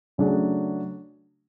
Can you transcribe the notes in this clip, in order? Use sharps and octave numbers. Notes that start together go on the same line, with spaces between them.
C#3 F#3 A3 D4 G#4